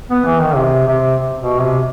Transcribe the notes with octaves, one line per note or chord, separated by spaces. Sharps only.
B3
E3
D#3
C3
C3
B2
C3